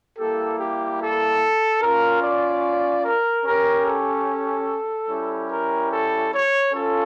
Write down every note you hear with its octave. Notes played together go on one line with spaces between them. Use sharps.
G3 A#3 E4 G4 A4
G4
A4
C#4 F4 A#4
D5
A#4
C#4 G4 A#4
A4
G3 C#4 E4 G4
A#4
A4
C#5
C#4 F4 A4